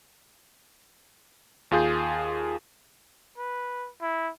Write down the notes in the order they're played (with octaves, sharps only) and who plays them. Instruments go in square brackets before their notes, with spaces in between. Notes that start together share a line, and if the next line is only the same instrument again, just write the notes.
[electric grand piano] D#2 F4 G#4 G6
[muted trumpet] B4
E4